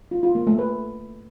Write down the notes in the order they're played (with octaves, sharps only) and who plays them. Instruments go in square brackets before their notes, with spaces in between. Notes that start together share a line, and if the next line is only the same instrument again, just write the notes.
[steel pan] F4
F4
A#3
A3
B4